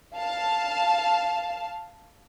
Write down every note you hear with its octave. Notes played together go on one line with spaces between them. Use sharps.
F5 A5